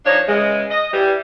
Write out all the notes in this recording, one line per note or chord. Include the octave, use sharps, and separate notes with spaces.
F3 D4 D#4 C#5
C#3 E3 G#3
D#5
E3 G3